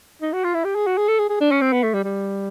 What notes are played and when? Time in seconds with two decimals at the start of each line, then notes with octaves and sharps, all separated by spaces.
0.22 D#4
0.33 F#4
0.44 F4
0.55 E4
0.65 G4
0.75 G#4
0.87 F#4
0.97 G#4
1.08 A4
1.19 G#4
1.29 G#4
1.41 D4
1.51 C#4
1.61 C4
1.73 B3
1.83 A3
1.94 G3
2.04 G3